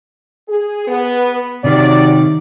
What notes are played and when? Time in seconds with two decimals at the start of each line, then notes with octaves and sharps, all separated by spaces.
0.48 G#4
0.87 B3
1.64 C3 D#3 F#3 G4 D5